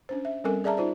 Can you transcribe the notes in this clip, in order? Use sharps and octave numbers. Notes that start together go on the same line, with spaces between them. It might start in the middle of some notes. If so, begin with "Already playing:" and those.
C#4 D4 C5
E5
G3 C4 C#4 A4 A#4 G#5
G#4 D5 E5 A5 A#5
D#4 F4 C5 D5